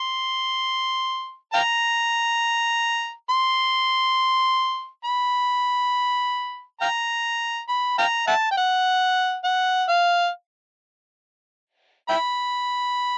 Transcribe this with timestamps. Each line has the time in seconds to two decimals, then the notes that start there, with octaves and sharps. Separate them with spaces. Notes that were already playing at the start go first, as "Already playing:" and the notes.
Already playing: C6
1.54 F5 G5 A#5
3.30 C6
5.05 B5
6.81 F5 G5 A#5
7.69 B5
7.98 F5 G5 A#5
8.27 E5 F#5 A5
8.51 G5
8.57 F#5
9.44 F#5
9.89 F5
12.09 E5 G5 B5